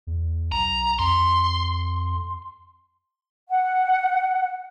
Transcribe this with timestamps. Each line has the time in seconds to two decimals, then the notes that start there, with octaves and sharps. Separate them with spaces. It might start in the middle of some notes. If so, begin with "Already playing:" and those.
0.07 E2
0.52 B1 A#5
0.99 F2 C6
3.49 F#5